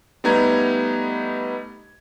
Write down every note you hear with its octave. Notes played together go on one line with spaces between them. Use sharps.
G3 A3 B3 D#4 A#5 G#6